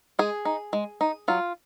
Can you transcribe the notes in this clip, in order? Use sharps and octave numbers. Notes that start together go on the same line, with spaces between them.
G#3 G#4
D#4
G#3
D#4
F#3 F4